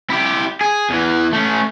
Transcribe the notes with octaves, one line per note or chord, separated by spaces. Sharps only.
E4 G4
G#4
E2 E3
A3 C#4